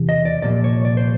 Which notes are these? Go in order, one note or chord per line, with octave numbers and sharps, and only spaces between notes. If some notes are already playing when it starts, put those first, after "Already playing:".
Already playing: E2 C3 E3
D#5
D5
C2 A#2 F3 D5
C#5
D5
C5